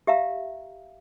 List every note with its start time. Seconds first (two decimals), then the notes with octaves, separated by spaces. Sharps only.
0.07 G4 E5 F5 A#5